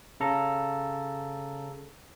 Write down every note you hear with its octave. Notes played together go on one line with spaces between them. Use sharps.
C#3 A4 A#5